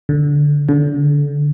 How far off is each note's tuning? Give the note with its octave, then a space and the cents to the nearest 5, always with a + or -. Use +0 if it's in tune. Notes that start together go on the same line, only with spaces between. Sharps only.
D3 -10
D3 -30